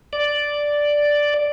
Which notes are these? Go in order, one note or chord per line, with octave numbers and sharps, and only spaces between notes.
D5